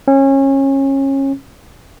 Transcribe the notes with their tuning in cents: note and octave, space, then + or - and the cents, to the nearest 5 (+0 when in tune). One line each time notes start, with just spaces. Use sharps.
C#4 -25